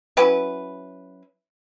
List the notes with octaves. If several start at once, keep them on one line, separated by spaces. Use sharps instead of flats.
F#3 C#4 E4 G4 B4